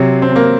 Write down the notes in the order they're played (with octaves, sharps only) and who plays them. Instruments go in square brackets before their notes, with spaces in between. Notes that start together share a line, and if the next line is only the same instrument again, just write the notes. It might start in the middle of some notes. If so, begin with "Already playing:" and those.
Already playing: [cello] C3 [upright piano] F#3
[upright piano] C4
A#3